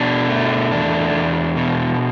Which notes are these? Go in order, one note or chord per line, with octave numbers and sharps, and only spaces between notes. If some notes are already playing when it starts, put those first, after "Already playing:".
Already playing: B2 D4
A3
E2 D4
E2
B2